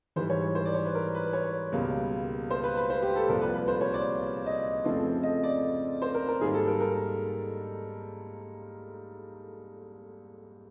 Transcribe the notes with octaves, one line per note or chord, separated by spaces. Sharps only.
G#2 E3 G3 C5
C#5
C5
D5
C#5
B4
A#4
B4
C#5
C#2 B2 G3 A#3
C5
B4
B4
C5
G4
A4
C2 A#2 F3 A#4
B4
B4
C5
C#5
D5
D#5
F2 C#3 F3 A3 C4
D#5
D5
C5
A#4
A#4
G#2 D#3 G3 A#3 G#4
A4
A#4
A#4